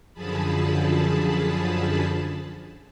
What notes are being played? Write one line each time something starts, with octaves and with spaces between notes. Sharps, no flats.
F#2 D3 F3 G#4 A5 B5